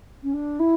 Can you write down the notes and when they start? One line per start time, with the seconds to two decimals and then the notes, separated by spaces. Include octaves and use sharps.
0.23 C#4
0.33 D4
0.59 E4